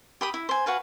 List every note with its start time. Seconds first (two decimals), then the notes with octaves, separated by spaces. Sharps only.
0.21 G4 B5 D#6
0.34 E4
0.49 C5 G#5
0.66 F#4 B4 F5 G#5